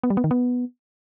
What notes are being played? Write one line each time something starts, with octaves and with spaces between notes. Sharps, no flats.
B3
G3
B3
D#3
B3